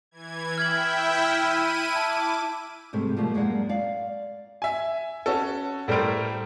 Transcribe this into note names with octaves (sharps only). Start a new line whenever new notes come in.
E3 G#6
E4 E5 G5 F6 G#6 F#7
E4 E6 F6 D#7
A5 D6
G#2 C3 G3 A3
B2 F3 G3 A3 A#3
F#2 G#3 A#3 D5 F#5
D5 F5
E5 G#5
C#4 F#4 A4
A2 G3 A3 A#4 C5 D7